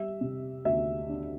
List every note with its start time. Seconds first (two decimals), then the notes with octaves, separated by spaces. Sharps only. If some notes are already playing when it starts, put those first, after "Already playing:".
Already playing: G3 E5
0.21 C3
0.65 D2 E5
1.09 D4